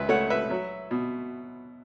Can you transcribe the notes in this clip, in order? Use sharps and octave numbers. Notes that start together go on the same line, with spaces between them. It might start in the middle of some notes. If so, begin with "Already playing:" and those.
Already playing: C#2 B4 E5
A3 C#5 F#5
B4 E5
F#3
B2